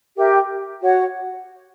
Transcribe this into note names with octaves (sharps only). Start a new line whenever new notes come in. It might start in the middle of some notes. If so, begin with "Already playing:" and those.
G4 A#4 E5 G5
F#4 C#5 F#5